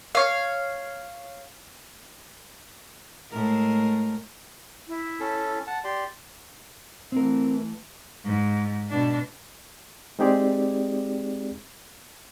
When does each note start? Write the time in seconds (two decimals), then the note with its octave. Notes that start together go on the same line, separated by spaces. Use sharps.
0.15 C#5 F5
3.31 A2 G#3 A#4
4.88 E4
5.20 C#4 A4
5.67 F#5 A5
5.84 G4 D5 C6
7.12 E3 A3 C4 A#4
8.25 G#2
8.89 B2 D4
10.19 G#3 C4 D#4 G4 G#4 D5